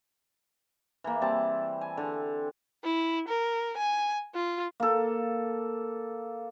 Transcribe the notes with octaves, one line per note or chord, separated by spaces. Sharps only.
E3 A#3
G3 C4 A5
G#5
D3
E4
A#4
G#5
F4
A#3 A4